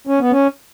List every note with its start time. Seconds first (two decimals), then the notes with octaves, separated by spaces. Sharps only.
0.07 C#4
0.19 B3
0.31 C#4